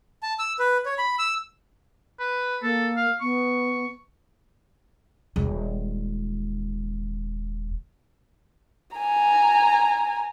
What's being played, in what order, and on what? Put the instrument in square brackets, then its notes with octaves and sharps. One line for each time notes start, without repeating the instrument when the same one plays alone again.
[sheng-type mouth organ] A5
E6
B4
C#5
B5
E6
[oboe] B4
[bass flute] A#3 [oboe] A4
[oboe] F5
[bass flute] B3 [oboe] C#6
[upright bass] D#1 G#3
[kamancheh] G#5 A#5